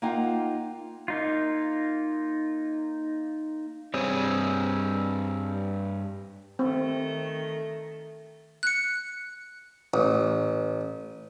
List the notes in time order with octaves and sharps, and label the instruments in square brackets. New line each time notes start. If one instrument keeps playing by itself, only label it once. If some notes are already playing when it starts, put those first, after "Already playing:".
[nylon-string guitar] A#3 D#4 F4 F#5 G5
[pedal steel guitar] A#3 D#4 F4
[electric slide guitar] G2 C5 C#5 [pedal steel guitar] G3 C4 G#4
[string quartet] D#3 A3 [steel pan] C4
[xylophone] F#6 C#7
[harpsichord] A1